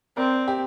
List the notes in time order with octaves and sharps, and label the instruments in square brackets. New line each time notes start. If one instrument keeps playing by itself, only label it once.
[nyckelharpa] C4 [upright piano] A#4 D5
[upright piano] G4